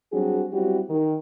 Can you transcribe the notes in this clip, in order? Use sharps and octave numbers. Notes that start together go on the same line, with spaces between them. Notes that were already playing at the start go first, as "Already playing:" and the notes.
F#3 G3 C4 D4 F#4 G#4
F#3 G3 C4 E4 F#4 G4
D#3